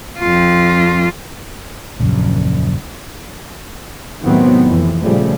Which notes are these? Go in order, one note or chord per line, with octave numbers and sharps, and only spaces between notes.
F2 F4
D#1 A#1 F#2 C#3
A2 C3 D#3 F#3 B3 C4
F2 E3
A#2 C#3 F3 G3 A3